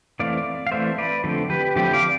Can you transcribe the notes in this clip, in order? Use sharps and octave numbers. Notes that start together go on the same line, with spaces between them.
E3 A3 C4 D5 F5
F5
E3 A3 C4 C5 E5
B4 D5
D3 F3 A3 C4
G4 B4
D3 F3 A3 C4 G4
D5 F5